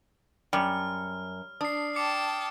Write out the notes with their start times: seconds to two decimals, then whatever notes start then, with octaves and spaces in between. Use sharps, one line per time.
0.53 F#2 G3 F6
1.61 D4 D#6 C7
1.96 G5 A5 D6 C#7